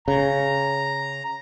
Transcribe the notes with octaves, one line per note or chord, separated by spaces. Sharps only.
C#3 A#5